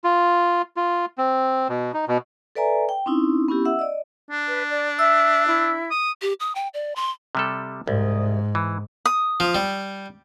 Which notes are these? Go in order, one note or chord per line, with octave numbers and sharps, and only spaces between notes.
F4
F4
C4
B2
D#4
B2
A4 B4 D5 E5 G#5 A#5
G5
C4 C#4 D#4 E4
B3 C#4 E4 G4
E5 F#5 E6
D5 D#5
D4
B4
D5
E5 E6
E4
D#6
G4
D#6
G5
D5
C6
C3 G3 A4
C2 G#2
E3
D#6
F3
G3